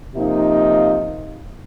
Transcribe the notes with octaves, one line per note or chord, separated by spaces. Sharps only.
C3 F3 A#3 D#4